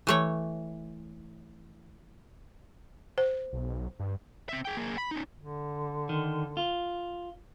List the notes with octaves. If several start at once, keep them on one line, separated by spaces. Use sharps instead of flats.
E3 A3 C#5
C5
B1
G2
C4 E5
G#4 G5
A#3 G#4
B5
C#4 D#4
D3
D#3
F4